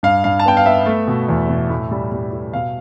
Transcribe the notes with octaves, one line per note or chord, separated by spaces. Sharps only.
G2 F5
G2 F5
A5
B3 G5
F5
B3 E5
A3
B2
E2
B2
A2
G3
G3
A2
B2 F5